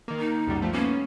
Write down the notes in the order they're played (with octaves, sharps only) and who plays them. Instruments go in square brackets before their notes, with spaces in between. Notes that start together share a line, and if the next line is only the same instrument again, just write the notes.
[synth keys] D#3 A#3
[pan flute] D#4
[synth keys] C#2 F#2 G3
F3 A3
[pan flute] A#3 [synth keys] B3 C#4